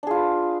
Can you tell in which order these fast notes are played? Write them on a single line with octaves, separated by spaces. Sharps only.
D4 G#4 F4 B4